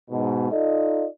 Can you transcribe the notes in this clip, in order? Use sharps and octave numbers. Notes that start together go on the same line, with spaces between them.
G#2 B2
D#4 F4 A4 D5 D#5